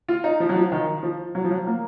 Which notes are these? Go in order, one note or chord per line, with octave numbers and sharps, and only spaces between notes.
F4
D#4
F3
F#3
F3
D#3
F3
F#3
F3
F#3
A#3